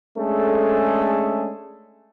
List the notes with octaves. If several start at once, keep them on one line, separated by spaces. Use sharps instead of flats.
G#3 A3 C#4 D4 G#4 A4